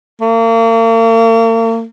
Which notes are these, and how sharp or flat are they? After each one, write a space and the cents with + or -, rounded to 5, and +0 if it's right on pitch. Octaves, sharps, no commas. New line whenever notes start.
A#3 -40